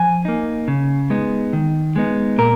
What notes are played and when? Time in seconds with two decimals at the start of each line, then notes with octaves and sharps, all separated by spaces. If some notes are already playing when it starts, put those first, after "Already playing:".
Already playing: F3 G#5
0.25 A#3 D#4
0.68 C#3
1.10 G#3 B3 D#4
1.53 D#3
1.96 G#3 B3 D#4
2.38 A#2 A#4